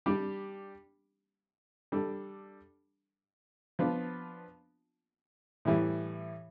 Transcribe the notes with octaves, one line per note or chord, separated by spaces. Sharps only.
G3 D4 G4
G3 D4 A4
F3 B3 D4 F4
A2 E3 G3